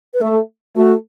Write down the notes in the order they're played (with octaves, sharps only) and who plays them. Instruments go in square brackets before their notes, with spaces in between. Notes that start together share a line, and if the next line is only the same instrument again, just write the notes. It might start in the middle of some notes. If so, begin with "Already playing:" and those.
[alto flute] B4
[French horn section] A3 [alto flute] A4
[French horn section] A3 [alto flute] F#4